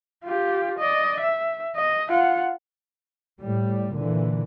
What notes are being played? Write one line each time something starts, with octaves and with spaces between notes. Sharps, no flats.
F4 G4
D5 D#5
E5
D#5
F4 F#5
A2 G3
A#2 D3 E3